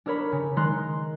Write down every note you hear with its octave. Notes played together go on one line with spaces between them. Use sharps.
D4 A4 A#4 C#5 B5
C#3
D#3 G#3 A#4 C6 F#6